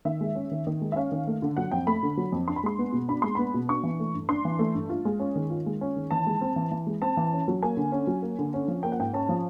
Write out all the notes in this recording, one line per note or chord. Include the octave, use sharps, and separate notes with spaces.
D#3 E5
G#3
C#4
D#3
D#3
G#3
E5
C#4 F5
D#3
A3
D3
F#3 F#5
F2 G5
A3 B5
D3
F#3
F2
D4 C6
B5
G#3 C6
B3
B2
D4 B5
G#3 C6
B3 B5
B2
D4 C#6
E3
A3
G2
D4 C6
E3
A3
G2
F4
G#3
C#4
D#3
F4
G#3
C#4
D#3
E3 A5
G#3
C4
E3
E3
G#3
C4 A5
E3
C#4
F#3
A#3 G#5
D3
C#4
F#3
A#3
D3
C#4
F3
A#3 G5
F#5
G#2 G5
C#4 A5
F3